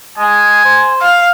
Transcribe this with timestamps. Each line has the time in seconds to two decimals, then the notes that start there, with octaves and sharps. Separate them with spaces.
0.18 G#3 G#5
0.65 C5
1.01 F5